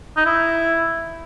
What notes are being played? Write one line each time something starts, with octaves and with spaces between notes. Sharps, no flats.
D#4
E4